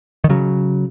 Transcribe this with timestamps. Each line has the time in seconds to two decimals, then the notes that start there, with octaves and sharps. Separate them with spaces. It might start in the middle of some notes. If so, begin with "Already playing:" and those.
0.24 D#3
0.29 C#3 F#3